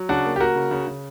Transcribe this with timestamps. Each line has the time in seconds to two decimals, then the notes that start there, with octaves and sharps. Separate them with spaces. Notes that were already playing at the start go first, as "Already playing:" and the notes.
Already playing: F#3
0.09 C#3 D4 F#4
0.25 A#3
0.36 G4
0.40 A#3 F#4 A#4
0.55 C#3
0.71 C#3
0.87 C#3